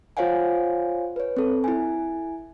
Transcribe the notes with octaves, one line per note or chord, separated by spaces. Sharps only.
F4 C5 C#5 F5 F#5 G#5
B4 C#5
C4 A4
E4 G#5